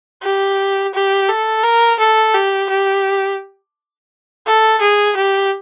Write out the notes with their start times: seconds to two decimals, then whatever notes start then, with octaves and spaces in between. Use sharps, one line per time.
0.22 G4
0.94 G4
1.29 A4
1.63 A#4
2.00 A4
2.34 G4
2.69 G4
4.46 A4
4.80 G#4
5.16 G4